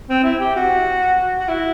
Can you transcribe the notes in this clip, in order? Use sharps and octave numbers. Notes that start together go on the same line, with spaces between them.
C4
E4
G4
F#4
F#4
E4